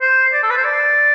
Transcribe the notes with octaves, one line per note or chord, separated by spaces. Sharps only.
C5
D5
A4
B4
C5
D5